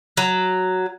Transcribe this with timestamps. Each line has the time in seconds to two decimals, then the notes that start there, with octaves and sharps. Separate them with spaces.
0.17 F#3